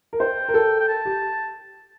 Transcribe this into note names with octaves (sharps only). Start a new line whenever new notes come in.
A#4
C5 G5
A#4
A4
G5
A5
G4